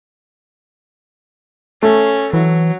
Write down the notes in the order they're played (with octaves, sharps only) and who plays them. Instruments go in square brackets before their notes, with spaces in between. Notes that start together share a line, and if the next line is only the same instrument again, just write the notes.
[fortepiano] A3 [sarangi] C#4
[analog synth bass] E3 [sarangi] F#3